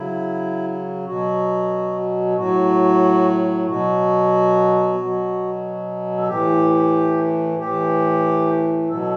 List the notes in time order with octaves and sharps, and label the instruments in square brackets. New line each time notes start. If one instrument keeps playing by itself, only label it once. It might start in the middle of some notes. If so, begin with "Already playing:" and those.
Already playing: [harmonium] C#3 F#3 E4
B2 F#3 F#4
A2 F#3 F#4
B2 F#3 F#4
B2 F#3
A4
A2 E3 G4
A2 E3 G4
B2 F#3 A4